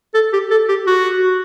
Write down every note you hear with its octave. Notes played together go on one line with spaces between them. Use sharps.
A4
G4
A4
G4
F#4